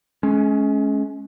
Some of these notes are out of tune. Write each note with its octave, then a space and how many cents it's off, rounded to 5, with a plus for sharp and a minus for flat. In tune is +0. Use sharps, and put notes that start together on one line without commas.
G#3 +35 C#4 +0